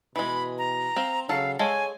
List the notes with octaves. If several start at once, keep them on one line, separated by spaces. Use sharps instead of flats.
B2 E3 G#3 B5
A#5
C4 C5 F5
C#3 F#3 A4 F5
G#3 A4 C#5 F5 G#5